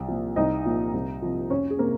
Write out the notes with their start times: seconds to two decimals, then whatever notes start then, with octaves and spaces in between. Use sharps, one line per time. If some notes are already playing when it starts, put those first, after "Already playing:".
Already playing: C2
0.08 A#2 F3
0.36 C2 D#4 D#5
0.66 A#2 F3
0.93 C2
1.22 C3 F3
1.50 F2 C#4 C#5
1.70 G#4
1.79 C3 A#3 A#4